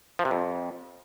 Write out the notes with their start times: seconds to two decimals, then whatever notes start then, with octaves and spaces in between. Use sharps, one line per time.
0.19 F3
0.25 C3
0.31 F2